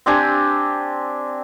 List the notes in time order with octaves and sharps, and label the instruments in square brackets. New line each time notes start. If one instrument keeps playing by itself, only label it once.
[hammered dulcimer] C4 D4 G4 G#5